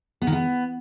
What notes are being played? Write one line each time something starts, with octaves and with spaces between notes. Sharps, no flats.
B3
D#3
B3